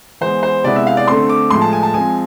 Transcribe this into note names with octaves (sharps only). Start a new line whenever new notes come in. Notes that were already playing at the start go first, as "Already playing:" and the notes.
E3 G#3 B3 C5
C5
C3 G#3 B3 E4 D5
E5
F5
D5
D3 A3 C4 C6
D6
A2 F3 G#3 C6
A5
G#5
A5
F3 G#3 C4 G#5